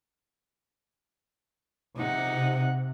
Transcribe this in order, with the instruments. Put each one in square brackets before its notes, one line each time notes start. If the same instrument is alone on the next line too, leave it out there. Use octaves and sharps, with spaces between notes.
[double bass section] C3 [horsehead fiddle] D#4 F#5